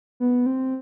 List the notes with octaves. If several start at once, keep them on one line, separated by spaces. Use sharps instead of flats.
B3
C4